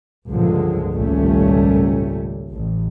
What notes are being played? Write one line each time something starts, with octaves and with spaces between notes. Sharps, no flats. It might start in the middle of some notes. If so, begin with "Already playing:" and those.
C#2 G2 A#2 D3 F3 G#3
G#1 C#2 A#2 G3 A3 C#4
A1